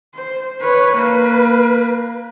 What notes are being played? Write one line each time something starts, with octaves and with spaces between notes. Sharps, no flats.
C5
B4 C#5
A#3 B4